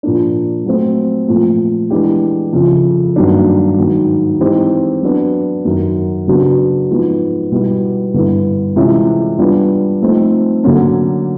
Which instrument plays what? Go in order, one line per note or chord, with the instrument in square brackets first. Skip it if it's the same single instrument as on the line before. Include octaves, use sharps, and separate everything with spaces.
[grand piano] A#2 F3 A#3 D4
F#3 A3 C4
A#2 F3 A3
E3 G#3 B3 D4 G4
F2 C#3 F3
G2 D#3 F#3 A#3 D4
G#2 D#3 F#3
E3 G#3 C4 D#4 G4
F#3 B3 D4
F#2 D#3 F#3
C#3 F#3 B3 D4 F#4
G#2 F3 G#3 B3
B2 G3 B3 E4
G2 D3 G3 B3 E4
C3 E3 G#3 C#4 F4
G3 B3 D4 F4
F3 A3 C4 D#4
D3 F#3 A#3 C#4